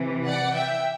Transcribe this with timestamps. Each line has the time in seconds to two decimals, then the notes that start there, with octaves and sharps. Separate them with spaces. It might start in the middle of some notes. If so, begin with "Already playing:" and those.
Already playing: C3 E3
0.26 D5 F#5
0.54 E5 G5